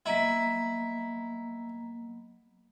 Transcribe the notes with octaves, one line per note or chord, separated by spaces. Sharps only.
F#3 A#3 B3 E4 D#5 A#5 B6